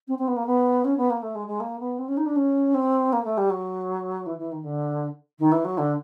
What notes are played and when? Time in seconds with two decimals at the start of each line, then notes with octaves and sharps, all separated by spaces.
0.08 C4
0.18 C4
0.27 B3
0.36 A#3
0.46 B3
0.84 C#4
0.97 B3
1.10 A#3
1.22 A3
1.35 G#3
1.47 G#3
1.60 A#3
1.79 B3
1.98 C4
2.08 C#4
2.17 D#4
2.26 D4
2.36 C#4
2.74 C4
3.12 A#3
3.24 A3
3.37 G3
3.50 F#3
4.26 E3
4.38 E3
4.51 D#3
4.63 D3
5.39 D#3
5.52 E3
5.64 F#3
5.78 D3